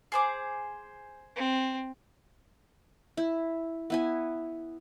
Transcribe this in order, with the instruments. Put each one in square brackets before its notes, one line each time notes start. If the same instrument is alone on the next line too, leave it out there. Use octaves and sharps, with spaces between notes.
[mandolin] G#4 C5 D6
[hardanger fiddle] C4
[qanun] E4
B3 E4 G#5